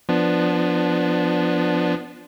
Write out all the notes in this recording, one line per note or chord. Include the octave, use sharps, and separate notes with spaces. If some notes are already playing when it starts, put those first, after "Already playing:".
F3 B3 D4